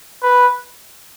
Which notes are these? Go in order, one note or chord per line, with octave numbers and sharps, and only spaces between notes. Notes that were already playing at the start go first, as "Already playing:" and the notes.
B4